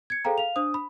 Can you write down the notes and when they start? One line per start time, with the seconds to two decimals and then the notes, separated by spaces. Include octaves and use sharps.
0.10 G#6 C#7
0.25 G#4 A4 C5 F5 G5 A#5
0.38 F5 F7
0.56 D4 C5 D#6
0.74 B5